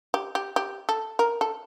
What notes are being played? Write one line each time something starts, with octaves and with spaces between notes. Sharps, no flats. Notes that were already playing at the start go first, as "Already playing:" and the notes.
G4
G4
G4
A4
A#4
A4